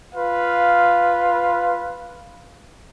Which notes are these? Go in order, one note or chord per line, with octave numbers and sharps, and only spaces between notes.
F4 B4 F5